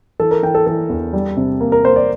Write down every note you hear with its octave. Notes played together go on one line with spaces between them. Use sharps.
E3 A4
A#4
E3 G5
A4
E3 A4
E2
G3
C3
A#3
A#4
A#3 C5
D5